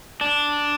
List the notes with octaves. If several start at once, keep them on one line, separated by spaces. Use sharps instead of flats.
D4